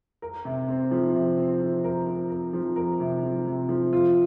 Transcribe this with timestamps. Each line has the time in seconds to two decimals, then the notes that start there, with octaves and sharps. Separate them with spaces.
0.22 A#4
0.45 C3
0.68 C4
0.91 F3
1.14 C3
1.37 C4
1.60 F3
1.84 A#4
2.07 C4
2.30 A#4
2.53 F3
2.76 A#4
3.00 C3
3.23 F3
3.47 C3
3.69 F3
3.93 F4